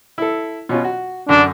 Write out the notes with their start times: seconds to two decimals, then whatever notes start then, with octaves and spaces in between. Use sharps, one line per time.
0.18 E4 A4
0.69 B2 C#4 F4
0.84 F#4
1.29 F#2 D3 D4